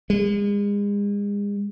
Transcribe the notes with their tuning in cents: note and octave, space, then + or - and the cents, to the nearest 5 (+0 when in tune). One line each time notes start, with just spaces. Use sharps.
G#3 -35